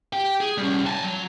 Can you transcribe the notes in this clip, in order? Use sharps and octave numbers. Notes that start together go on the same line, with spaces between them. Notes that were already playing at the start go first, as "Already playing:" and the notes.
G4 G5
G#4
G3 C#4
G#5 A5
F#3